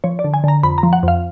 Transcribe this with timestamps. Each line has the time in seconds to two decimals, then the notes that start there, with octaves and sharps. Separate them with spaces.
0.04 F3 C#5
0.19 D5
0.24 D3
0.34 G#5
0.44 D3 A#5
0.63 F2 B5
0.78 A#5
0.83 F3
0.93 F#5
1.03 F2 F5